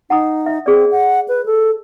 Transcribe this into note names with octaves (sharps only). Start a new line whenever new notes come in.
D#4 F#5 A#5 D#6
E5
C4 G#4 D5
F#5
B4
A4